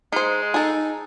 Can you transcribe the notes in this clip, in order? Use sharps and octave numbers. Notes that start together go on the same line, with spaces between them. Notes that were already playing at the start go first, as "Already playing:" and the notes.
G#3 D#4 C5
D#4 G#4 A4